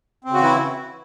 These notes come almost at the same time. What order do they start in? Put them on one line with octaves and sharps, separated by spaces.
C4 C#3 F#4 E3 E4